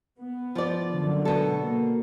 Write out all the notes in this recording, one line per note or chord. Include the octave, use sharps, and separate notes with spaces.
B3
F3 D5
F#2 D3
B2 A4
A#3